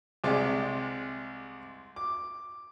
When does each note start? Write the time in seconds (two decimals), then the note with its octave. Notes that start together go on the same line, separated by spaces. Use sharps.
0.24 C2 C3 G#3 D5
1.96 D6